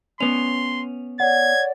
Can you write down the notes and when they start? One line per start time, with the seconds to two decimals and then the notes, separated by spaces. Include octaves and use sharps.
0.21 B3 C#4 C6 F7
1.20 C#5 D5 F#5 G#6